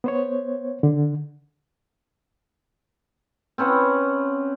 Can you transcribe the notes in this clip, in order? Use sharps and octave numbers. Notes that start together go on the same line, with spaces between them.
B3 C5 C#5
D3
C4 C#4 B4 F#5